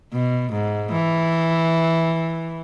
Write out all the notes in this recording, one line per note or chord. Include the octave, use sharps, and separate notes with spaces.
B2
G#2
E3